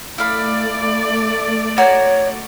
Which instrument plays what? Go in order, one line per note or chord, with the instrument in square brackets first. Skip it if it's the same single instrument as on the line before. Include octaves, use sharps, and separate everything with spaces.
[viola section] A3 D5 [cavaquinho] E4 F5 B5
[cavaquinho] F#4 A#5 [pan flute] C#5